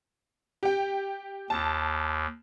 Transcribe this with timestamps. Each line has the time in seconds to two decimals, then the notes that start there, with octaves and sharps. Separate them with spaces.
0.63 G4 G5
1.50 D#2 A5